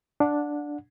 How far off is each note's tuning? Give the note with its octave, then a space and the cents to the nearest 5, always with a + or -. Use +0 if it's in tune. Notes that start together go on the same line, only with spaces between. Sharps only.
D4 +0 F#5 -25